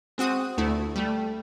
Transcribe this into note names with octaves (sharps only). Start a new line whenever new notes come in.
G#3 C4 F#4 D#6
D2 A3 E4
G3 A3